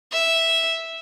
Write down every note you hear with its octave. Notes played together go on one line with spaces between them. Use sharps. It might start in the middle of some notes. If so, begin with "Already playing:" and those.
E5